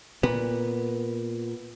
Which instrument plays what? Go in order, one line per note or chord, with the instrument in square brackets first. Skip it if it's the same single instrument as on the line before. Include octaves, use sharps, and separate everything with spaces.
[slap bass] A#2 [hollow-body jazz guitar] B3